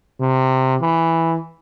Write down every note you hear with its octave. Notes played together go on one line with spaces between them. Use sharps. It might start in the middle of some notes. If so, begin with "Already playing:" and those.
C3
E3